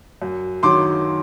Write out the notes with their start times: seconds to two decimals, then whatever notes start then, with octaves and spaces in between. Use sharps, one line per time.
0.22 F#2
0.63 D#3 F#3 C6 D6